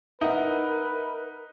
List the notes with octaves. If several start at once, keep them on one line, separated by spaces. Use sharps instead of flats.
D#4 A#4 B4 E5 F#5